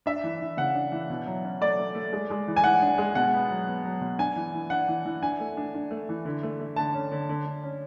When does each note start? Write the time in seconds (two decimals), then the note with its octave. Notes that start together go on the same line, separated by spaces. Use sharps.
0.06 D4 E5
0.24 E3
0.41 E3
0.57 C#3 F#5
0.75 D4
0.92 E3
1.10 B2
1.27 F#3
1.44 C#4
1.61 A3 D5
1.79 A3
1.95 A3
2.13 G#3
2.30 G#3
2.48 E3
2.57 G#5
2.64 E3 F#5
2.82 D4
2.98 G#3
3.15 B2 F#5
3.33 B3
3.51 F#3
3.67 B3
3.85 F#3
4.01 B2
4.19 D4 G#5
4.36 E3
4.54 E3
4.70 D4 F#5
4.88 E3
5.05 E3
5.22 D4 G#5
5.40 A3
5.57 D4
5.74 D4
5.91 A3
6.09 E3
6.25 D3
6.43 A3
6.60 A3
6.76 D3 A5
6.94 C#4
7.12 D3
7.29 D3
7.46 D3
7.64 C#4